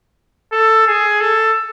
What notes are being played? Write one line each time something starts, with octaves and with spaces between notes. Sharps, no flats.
A4
G#4
A4